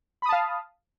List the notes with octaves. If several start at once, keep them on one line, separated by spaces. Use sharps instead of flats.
F5 A5 B5 D#6